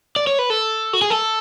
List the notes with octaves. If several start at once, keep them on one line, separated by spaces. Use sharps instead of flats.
D5
C#5
B4
A4
F#4
G#4
A4